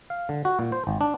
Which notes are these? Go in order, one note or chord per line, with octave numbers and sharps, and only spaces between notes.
F5
D3
F#4
A#2
C5
G#1
D4